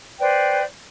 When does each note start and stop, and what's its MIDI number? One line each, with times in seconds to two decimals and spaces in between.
0.18 0.63 71
0.18 0.63 72
0.18 0.63 74
0.18 0.63 79